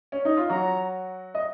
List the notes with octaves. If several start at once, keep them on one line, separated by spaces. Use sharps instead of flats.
C#4
D#4
F4
F#3 F#4 A#5
D#5